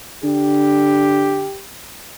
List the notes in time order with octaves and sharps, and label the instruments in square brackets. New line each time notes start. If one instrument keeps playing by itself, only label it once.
[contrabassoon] D3 [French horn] G4